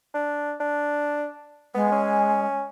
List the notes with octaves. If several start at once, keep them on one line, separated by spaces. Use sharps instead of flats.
D4
D4
G#3 B3
C#4